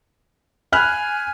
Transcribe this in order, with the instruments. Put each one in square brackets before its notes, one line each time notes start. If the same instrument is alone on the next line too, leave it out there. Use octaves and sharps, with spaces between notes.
[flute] G#5 [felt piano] B5 F6 F#6